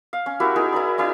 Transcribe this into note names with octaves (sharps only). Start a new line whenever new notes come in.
F5
C#4
E4 F#4 G4 A#4
D#4 E4 G#4 A#4
E4 A#4 D5
C#4 D#4 E4 D5